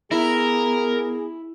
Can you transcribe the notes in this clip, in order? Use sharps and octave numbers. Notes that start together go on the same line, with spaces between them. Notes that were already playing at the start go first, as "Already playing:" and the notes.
B3 E4 G#4 A#4